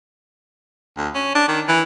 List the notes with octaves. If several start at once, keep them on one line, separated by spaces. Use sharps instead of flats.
D2
C#4
D4
D#3
E3